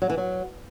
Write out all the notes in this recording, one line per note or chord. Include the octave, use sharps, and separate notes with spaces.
F#3
E3
F#3